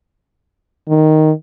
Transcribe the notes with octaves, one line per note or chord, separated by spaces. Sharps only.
D#3